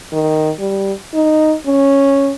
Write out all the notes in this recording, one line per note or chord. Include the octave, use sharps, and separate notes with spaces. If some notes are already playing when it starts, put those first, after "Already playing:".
D#3
G3
D#4
C#4